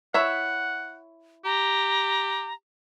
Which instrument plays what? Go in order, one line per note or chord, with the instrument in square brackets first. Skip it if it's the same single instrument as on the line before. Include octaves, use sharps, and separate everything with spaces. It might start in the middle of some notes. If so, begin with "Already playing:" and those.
[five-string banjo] E4 C#5 E5 [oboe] F#5
[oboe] G4 [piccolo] A#5